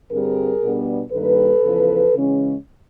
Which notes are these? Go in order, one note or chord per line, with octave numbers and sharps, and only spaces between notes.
G2 D3 G3 C4 G#4 A#4
B2 G3 B3 D4
G2 D#3 G3 A#3 A4 B4
E2 C#3 F3
C#3 E3 G#3 C#4